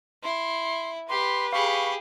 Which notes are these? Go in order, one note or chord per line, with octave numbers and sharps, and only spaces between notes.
E4 C6
G4 B4 C6
G4 G#4 F5 B5 C#6